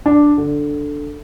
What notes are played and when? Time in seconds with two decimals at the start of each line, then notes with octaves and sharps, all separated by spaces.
0.06 D4
0.38 D3